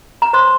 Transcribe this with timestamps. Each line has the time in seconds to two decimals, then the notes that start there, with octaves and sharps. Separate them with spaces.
0.22 A#5
0.33 C5 C6